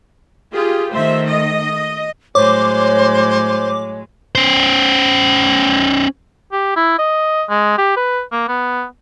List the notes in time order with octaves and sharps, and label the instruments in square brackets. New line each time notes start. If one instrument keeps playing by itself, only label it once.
[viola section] F4 G4 G#4
[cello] D#3 A3 [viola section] C5 E5
[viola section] D#5
[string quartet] A2 F#3 G#3 [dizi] C5 [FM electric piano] C#5 [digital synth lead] D6
[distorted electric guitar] C#4 C5
[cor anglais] G4
E4
D#5
G#3
G4
B4
A#3
B3